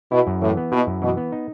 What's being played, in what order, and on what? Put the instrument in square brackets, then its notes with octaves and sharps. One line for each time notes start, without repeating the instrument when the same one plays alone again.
[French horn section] B2 [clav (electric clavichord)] E4
[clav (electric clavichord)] F#2
[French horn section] A2 [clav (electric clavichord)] E3
[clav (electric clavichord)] B3
[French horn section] B2 [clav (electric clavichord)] E4
[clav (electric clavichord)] F#2
[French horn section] B2 [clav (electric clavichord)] E3
[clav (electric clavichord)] B3
D#4